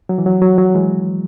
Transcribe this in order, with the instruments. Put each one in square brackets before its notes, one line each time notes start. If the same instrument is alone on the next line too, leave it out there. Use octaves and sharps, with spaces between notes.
[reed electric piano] F#3
E3
F#3
F#3
F#3
E3 G#3